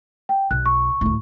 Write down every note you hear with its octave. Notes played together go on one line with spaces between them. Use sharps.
G5
B1 F#6
C#6
D2 A2